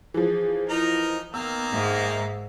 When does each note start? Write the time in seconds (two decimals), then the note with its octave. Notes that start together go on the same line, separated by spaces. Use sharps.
0.14 E3 F3 G#4
0.69 D#4 E4 A#4
1.34 D#3 A#3 B3 E6
1.73 G#2 E5